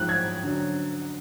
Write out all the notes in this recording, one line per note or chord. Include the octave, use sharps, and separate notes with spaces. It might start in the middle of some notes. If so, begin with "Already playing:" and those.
Already playing: G#2 F3 F#6
G#6
F#2 D3 F#3